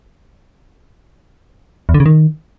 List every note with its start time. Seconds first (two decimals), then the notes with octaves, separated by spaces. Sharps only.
1.89 E2
1.94 D3
2.00 C#3
2.06 D#3